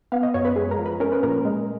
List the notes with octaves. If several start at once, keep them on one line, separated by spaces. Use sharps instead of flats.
B3 F5
D#5
F#2 C#5
B4
G#3 G#4
A#4
F3
B4
C#4 A#4
B4
A#2 A#4
G#3